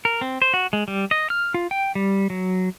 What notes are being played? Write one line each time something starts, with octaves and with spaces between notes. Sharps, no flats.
A#4
C4
C5
F#4
G#3
G3
D#5
F6
F4
G5
G3
F#3